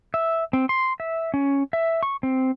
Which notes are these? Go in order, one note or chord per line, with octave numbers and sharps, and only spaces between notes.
E5
C4
C6
E5
C#4
E5
C#6
C4